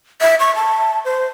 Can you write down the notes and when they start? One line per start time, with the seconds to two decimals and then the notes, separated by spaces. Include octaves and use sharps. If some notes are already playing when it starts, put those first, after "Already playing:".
0.21 E5
0.40 C#6
0.55 A5
1.05 C5